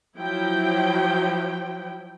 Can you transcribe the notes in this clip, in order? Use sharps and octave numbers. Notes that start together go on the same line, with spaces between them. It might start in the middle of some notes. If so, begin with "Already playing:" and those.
F3 F#3 E4 G5